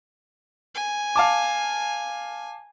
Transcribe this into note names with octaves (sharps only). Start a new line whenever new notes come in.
G#5
F5 A5 D6